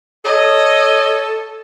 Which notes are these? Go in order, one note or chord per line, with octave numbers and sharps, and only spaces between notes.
A4 C#5 D#5